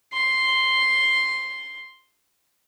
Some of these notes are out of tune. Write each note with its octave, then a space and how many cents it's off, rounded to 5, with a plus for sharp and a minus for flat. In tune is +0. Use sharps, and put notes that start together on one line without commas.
C6 +0